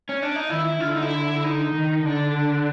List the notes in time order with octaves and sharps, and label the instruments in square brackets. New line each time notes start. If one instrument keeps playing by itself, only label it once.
[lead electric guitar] C#4
D4
D#4
[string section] D#3 [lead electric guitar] E4
[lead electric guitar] E4
[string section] D3 [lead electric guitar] F4
[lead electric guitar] E4
D#4
E4
D#4
[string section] D#3
[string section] D3 [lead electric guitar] D4